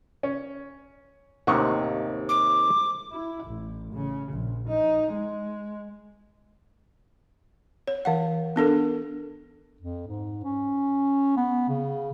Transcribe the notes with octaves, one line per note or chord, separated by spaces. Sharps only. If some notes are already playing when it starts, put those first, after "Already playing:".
C#4
A1 D#2 C3 D#3 F#5 C#6
D6
E4
A1
C#3
A#1
D#4
G#3
C#5
E3 F5 F#5
B3 D4 A4 A#4
F2
G#2
C#4
B3
C#3